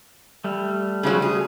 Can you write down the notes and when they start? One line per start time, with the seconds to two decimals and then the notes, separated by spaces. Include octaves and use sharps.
0.44 G3 A3
1.03 C#3 F3 F#3
1.22 G#4